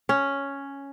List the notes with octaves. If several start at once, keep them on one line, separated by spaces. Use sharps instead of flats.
C#4